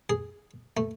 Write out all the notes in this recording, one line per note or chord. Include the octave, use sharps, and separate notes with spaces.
G#4
A3